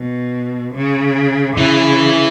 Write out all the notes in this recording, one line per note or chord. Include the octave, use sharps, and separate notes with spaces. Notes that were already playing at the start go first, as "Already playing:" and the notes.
Already playing: B2
C#3
C#3 E3